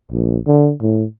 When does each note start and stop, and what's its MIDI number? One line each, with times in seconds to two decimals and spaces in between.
0.12 0.38 34
0.47 0.72 50
0.81 1.04 45